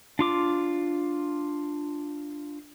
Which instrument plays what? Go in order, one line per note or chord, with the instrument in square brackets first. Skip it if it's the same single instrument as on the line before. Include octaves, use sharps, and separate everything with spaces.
[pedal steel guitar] D4 F4 D6